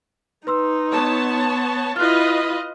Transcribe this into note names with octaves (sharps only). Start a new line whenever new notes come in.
D#4 B4 C6 E6
B3 C#5 A5
E4 F4 B4 D#5 F6 F#6